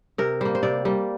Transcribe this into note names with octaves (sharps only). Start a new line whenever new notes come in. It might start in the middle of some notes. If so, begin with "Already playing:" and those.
C3 A#4
G3 A#3 C5
C5
C3 D5
G3 A#3